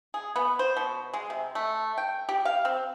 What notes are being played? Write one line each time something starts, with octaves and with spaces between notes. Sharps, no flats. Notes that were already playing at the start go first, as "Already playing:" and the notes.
G#4
B3
C5
B2
G#3
C3
A3
G5
G4
F5
C4